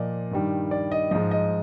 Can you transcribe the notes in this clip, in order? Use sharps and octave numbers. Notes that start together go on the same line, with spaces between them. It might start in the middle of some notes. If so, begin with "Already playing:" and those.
Already playing: A#2 F3 D5 D#5
G2 D#3 G3
D5
D#5
G#2 F3 D#5
D#5